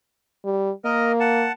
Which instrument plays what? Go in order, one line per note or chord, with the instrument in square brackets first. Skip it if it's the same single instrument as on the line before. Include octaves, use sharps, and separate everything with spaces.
[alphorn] G3
[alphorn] A#3 [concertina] A#4 D#5
[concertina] F#5 A5